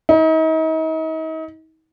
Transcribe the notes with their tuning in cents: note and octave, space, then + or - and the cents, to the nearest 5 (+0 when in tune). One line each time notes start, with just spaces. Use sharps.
D#4 +40